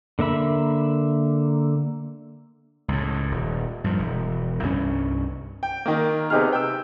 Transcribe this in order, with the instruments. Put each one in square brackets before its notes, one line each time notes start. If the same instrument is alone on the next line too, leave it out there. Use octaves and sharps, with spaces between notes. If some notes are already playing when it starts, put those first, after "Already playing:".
[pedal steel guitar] D3 A#3 E5 B5
[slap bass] C#2 A2
D#1
G2 F3
E1
C2 G2 C#4
[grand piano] G5
D#3 A#3
C3 B3 D#4 G4 G#4 F6
G5 E6